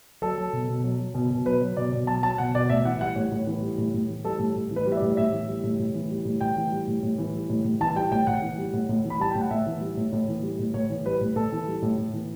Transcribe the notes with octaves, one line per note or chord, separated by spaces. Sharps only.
F#3 A4
F#3
B2
B2
F#3
F#3
B2
B2
F#3 B4
F#3
B2 D5
B2
F#3 A5
F#3 A5
B2 F#5
B2 D5
A2 E5
E3 F#5
G3 F#5
A2 C#5
A2
E3
G3
A2
A2
E3
G3 A4
A2
A2
E3
B4
G3
E5
D5
A2
A2 E5
E3
G3
A2
A2
E3
G3
A2
A2 G5
E3
G3
A2
A2
E3
G3
A2
A2
E3 A5
G3 G5
A2 G5
A2 F#5
E3
G3
A2
A2
E3
B5
G3 A5
A2 G5
F#5
A2 E5
E3
G3
A2
A2
E3
G3
A2
A2 C#5
E3
G3 B4
A2
A2 A4
E3
G3
A2
A2
E3